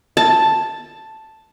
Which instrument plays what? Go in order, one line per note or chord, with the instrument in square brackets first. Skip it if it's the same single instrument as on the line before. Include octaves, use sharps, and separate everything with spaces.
[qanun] A5